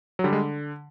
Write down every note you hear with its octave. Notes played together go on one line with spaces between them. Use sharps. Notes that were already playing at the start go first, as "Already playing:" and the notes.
F#3
D3 G3
G#3